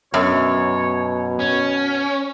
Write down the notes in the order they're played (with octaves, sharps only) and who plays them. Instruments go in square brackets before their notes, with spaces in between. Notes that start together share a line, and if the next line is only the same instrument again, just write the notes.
[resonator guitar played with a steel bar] F#2 [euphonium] B2 [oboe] C#5
[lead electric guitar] C#4 [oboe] G#5